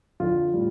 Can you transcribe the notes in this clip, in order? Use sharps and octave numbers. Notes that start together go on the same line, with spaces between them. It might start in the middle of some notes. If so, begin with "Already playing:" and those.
F2 D3 F3 F4
A2 G3